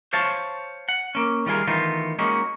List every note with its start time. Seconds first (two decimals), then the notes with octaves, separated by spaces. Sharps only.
0.13 C5 C#5 F5 A5
0.89 F#5
1.15 A#3 C#4
1.46 D#3 G3 F4 G#4 A#4
1.67 D#3 E3 A3 B3 D#4 F4
2.19 G#3 A#3 C#4 D#4 F#4